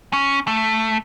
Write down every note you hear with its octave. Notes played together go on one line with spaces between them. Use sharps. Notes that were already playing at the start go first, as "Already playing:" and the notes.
C#4
A3